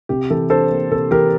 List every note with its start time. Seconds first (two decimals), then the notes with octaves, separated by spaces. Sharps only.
0.09 C3 G4
0.30 E3 A4
0.50 D4 A4 C5
0.71 A#3
0.91 C3 A4
1.11 E3 G4 A#4